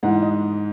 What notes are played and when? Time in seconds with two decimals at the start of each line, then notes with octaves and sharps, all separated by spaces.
0.03 G#2 E3 F#5
0.22 D#5